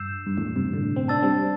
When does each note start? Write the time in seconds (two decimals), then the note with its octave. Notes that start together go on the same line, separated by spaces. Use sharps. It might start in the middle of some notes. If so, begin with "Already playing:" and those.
Already playing: G2 E6 G6 C7 E7
0.26 G2
0.37 E2 A2
0.56 G2 C3
0.73 A2 D3
0.96 C4
1.08 D4 A5 E6 A6
1.23 G3 C4